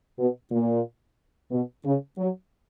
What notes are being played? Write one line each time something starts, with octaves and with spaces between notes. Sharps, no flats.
B2
A#2
B2
C#3
F#3